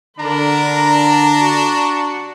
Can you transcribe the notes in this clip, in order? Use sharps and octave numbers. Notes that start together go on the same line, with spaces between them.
D3 D4 A#4 A#5 B5
F#4